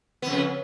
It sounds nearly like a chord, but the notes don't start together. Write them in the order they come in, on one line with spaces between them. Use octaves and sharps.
B3 F2 C#3